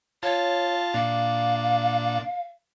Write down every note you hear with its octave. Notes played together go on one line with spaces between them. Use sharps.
F4 C#5 A5
A#2 D4 F5